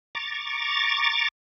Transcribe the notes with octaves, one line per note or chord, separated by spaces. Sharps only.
A#5 C#6 D6 A6